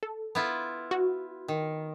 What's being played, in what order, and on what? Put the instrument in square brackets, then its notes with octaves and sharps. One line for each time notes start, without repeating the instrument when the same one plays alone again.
[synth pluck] A4
[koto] B3 E4 F4
[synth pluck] F#4
[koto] D#3